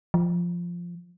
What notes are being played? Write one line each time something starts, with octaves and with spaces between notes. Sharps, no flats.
F3